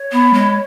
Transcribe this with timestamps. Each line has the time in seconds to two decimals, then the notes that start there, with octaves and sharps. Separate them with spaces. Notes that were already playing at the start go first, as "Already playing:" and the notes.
Already playing: C#5
0.12 B3 B5
0.33 G#3 C#5